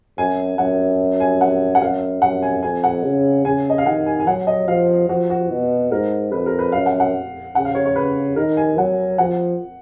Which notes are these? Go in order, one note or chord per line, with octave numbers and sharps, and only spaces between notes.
F#2 G#5
F#2 F#5
G#5
F#5
F#5
F#2 F5
F#2 F#5
G#5
F2 G#5
F#5
C#3
C#3 G#5
D#5
F5
D#3 F#5
G#5
G#5
F#3 F#5
D#5
F3 F5
F3 F#4
F#4
B2
G#2 A#4
F2 B4
A#4
B4
F#2 F5
F#5
F#5
C#3 F#5
F5
C#5
C#5
C#3 B4
D#3 A#4
G#5
F#3 F#5
F3 F#5